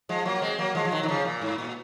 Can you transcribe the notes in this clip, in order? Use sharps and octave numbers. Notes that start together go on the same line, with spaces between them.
F3 G#3
F#3 A#3
G#3 C4
F#3 A#3
F3 G#3
F3
D#3 F#3
D#3
C#3 F3
A#2
G#2
A#2